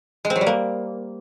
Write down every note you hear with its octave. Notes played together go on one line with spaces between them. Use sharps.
G#3
C4
F#3
G3
A#3